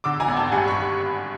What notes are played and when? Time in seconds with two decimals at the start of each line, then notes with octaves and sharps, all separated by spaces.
0.04 D3 D6 E6
0.20 G#5 A#5
0.28 G#1
0.37 G5 A5
0.52 G2 F#5 G#5
0.68 B5 C#6